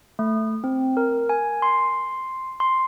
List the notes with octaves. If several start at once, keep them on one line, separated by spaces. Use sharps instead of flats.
A3
C4
A#4
G#5
C6
C6